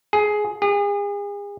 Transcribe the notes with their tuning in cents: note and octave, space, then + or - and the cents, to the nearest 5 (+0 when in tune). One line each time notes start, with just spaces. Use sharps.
G#4 +10
G#4 -40